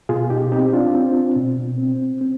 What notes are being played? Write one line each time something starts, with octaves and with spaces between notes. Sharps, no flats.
B2 F4 G#4
D#4 G4
C4 D#4 G4
D4 F4
C4
B2
C4
C4